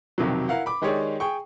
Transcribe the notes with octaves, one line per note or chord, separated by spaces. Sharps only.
B1 F2 C3 D#3 F#3
E4 A#4 F5 F#5
B5 D6
D#3 G#3 G4 G#4 C#5 D5
G#4 G5 C#6